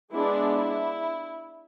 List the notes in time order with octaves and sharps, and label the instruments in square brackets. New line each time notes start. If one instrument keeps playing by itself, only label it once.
[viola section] G#3 B3 D4 E4
E4